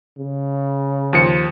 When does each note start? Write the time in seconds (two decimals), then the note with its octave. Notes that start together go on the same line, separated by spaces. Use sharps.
0.18 C#3
1.13 D#2 F3 C#7